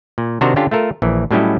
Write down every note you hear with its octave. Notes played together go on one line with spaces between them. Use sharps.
A#2
C3 D#3 D4 F#4 C5 A#5
D3 C#4 D4 F4 G4
A3 F4 A4 A#4
A#1 E3
A2 F#3 G3 C#4 E4 D#5